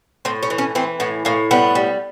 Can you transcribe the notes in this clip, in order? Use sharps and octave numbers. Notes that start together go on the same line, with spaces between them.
A2 C4
C#4
E3
C#4
E3 C4
A2 B3
A2 A#3
G3 B3
G3